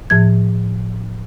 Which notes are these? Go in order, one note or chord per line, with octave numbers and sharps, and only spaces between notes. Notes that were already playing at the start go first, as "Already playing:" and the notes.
A2 F3 G#6